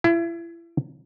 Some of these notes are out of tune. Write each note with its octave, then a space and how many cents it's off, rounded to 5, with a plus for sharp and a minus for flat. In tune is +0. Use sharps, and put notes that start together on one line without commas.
E4 +35